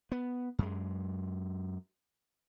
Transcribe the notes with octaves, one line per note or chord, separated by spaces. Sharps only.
B3
F#2 G#3